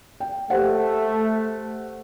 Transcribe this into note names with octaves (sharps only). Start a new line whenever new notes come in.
G5
A3 G4 C5 F#5